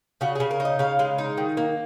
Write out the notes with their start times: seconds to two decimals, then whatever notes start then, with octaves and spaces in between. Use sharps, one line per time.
0.21 C#3 F#4
0.35 C#3 G#4
0.51 A#4
0.60 D#4
0.65 D#5
0.79 C#3 F5
0.99 G#3
1.18 D#4
1.38 D#3
1.57 A#3